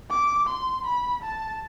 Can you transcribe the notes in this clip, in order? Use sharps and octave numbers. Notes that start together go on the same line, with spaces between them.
D6
C6
B5
A5